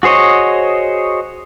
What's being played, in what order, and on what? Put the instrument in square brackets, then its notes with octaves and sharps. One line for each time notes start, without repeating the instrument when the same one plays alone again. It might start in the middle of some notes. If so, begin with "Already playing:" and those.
[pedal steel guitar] F#4 G#4 C5 C#5 D#5